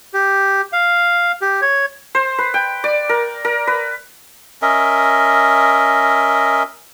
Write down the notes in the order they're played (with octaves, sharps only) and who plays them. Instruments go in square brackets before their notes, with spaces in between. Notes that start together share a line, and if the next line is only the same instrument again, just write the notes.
[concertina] G4
F5
G4
C#5
[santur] C5
B4
G5
D5
A#4
A#4
B4
[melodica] C#4 A#4 D#5 E5